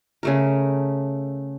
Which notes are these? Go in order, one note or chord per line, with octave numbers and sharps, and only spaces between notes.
C#3 A3 A#4